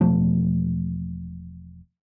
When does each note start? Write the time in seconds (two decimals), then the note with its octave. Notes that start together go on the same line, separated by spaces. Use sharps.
0.01 E1 B2 F3 A3